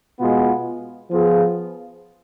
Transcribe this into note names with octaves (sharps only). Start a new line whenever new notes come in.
B2 G#3 B3 F4
F3 B3 F4 G#4